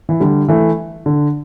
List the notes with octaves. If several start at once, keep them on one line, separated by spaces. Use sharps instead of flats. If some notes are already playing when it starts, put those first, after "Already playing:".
E3
D3 G3
E3 A3
D3